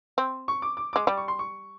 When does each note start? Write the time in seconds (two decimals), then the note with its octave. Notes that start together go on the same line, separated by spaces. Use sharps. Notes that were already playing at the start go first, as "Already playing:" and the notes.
0.18 C4
0.48 C#6
0.62 D6
0.77 D6
0.93 G#3 D6
1.07 G3 D6
1.17 C#6
1.28 C6
1.39 C#6